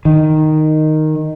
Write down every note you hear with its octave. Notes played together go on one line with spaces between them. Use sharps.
D#3